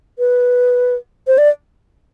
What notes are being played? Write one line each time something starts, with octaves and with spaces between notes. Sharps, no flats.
B4
C5
D5